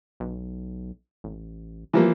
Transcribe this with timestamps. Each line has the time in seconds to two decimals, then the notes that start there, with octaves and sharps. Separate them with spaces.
0.20 B1
1.24 A1
1.93 E3 F3 A#3